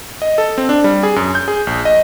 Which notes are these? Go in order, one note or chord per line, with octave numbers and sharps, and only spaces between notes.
D#5
A4
C4
D4
G3
G#4
F#2
G6
G#4
A#1
D#5